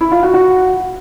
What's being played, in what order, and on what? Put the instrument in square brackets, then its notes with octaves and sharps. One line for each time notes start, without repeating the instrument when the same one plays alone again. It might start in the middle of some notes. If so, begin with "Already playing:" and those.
[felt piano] E4
F4
F#4
F#4